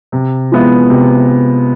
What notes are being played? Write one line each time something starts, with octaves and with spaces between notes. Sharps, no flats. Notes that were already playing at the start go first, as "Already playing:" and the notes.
C3
F3 G#3 B3 E4
C3